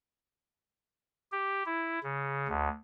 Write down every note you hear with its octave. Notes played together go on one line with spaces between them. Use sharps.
G4
E4
C#3
D2